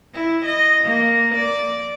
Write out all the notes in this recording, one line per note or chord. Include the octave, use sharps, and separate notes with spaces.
E4
D#5
A#3
D5